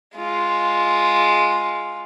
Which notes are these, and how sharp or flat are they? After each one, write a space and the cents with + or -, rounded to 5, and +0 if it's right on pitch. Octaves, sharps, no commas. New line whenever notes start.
G#3 +0 F4 +0